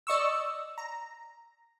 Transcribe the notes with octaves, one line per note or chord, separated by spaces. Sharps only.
D5 D#5 C#6 E6
A#5